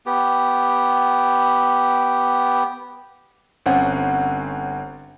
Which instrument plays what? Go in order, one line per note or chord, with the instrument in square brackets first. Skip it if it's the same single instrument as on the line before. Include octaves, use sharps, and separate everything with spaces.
[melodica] B3 G4
[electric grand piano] G1 C4 C#4 F#5